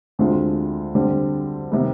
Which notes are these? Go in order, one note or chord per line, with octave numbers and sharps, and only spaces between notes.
D2 D3 G#3 C4 F4
D3 G3 C4
C3 D#3 G3 B3